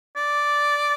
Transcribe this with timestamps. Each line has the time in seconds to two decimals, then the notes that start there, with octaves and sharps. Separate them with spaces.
0.16 D5